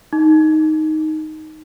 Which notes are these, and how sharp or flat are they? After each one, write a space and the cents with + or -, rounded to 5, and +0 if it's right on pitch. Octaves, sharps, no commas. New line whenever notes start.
D#4 +5